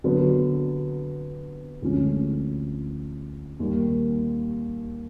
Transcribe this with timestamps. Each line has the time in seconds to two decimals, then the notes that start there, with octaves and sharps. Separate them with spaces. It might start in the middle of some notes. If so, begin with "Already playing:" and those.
0.04 D3 F#3 B3
1.82 D2 D3 F3 G#3 C#4
3.59 D#2 D#3 G3